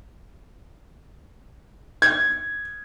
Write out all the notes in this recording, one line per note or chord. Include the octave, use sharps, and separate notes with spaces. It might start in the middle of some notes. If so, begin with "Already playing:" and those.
G#6